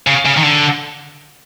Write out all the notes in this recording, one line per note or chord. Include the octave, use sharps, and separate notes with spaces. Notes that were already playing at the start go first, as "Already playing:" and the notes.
C#3
C#3
D#3
D3